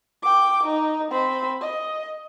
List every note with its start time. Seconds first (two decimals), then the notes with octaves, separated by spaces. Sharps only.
0.22 G5 D6
0.63 D#4
1.11 C4 B5
1.61 D#5